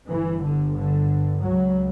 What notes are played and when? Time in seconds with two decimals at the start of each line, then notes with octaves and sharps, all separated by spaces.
0.11 G1 G2 E3
0.45 D3
0.78 D3
1.45 C#2 C#3 F#3